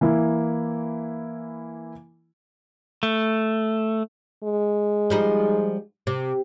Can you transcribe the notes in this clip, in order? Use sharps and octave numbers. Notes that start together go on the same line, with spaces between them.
E3 A#3 E4
A3
G#3
F3 G3 D#4
C3